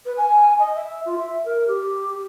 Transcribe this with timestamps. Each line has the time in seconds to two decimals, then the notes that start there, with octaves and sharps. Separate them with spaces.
0.05 B4
0.17 G#5
0.59 D#5
0.75 E5
1.05 F4
1.18 E5
1.45 A#4
1.67 G4